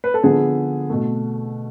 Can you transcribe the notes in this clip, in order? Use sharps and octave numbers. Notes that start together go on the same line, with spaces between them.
B4
A4
D3 F3 B3 G#4
B2 A3